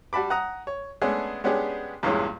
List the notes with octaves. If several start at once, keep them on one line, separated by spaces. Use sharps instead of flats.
G3 F#4 A5 B5 D6
F#5 A#5 D#6
C#5
G#3 A3 B3 C#4 D4 G#4
G#3 B3 C#4 D4 G4 G#4
E2 G2 A#2 E3 G#3 C#4